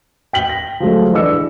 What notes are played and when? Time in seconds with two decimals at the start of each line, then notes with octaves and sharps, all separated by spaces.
0.33 G5 B6 F#7 G7
0.49 A#6
0.80 F3 F#3 G#3 A3
1.13 E3 D4 G#4 D#5 E6 C#7
1.30 C#7